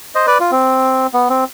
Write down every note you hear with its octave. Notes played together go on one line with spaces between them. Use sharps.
C5 D#5
B4 D5
F4
C4
B3
C4